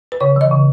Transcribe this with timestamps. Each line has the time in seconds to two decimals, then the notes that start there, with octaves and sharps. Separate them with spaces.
0.12 B4
0.21 C#3 C#5
0.36 E3 D#5
0.51 C#3